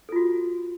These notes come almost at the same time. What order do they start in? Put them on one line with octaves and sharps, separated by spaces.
A4 F4 F#4